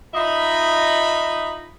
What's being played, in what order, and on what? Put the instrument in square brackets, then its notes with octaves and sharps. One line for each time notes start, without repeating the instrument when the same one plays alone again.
[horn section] D#4 F4 D#5 E5 A#5 B5